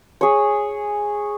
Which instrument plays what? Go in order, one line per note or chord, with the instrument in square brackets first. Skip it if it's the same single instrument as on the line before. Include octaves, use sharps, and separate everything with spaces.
[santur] G#4 C#5